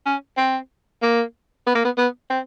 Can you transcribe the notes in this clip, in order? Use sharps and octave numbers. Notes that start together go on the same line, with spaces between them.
C#4
C4
A#3
B3
A#3
B3
B3
C4